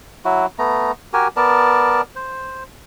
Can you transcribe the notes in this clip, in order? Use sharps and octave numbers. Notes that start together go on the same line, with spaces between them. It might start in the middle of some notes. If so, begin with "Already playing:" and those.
F#3 E4 F#4
A3 B3 A#5
F#4 G4 A#4 G#5
B3 A#4 D5 A5
C5